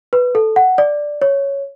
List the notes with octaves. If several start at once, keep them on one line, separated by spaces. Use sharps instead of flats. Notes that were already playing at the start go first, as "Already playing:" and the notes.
B4
A4
F#5
D5
C#5